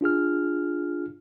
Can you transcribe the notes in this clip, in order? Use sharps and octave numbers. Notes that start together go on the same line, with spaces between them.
D4 F4 G#4 F6